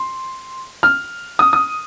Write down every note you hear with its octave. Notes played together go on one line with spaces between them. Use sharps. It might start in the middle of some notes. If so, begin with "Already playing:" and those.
Already playing: C6
F6
D#6
D#6